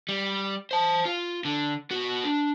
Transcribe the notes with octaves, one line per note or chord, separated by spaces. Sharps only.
G3
C5 A5
F4
D3
B3 F#4
D4